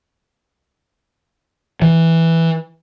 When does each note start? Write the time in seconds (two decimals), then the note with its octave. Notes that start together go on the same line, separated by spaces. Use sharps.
1.82 E3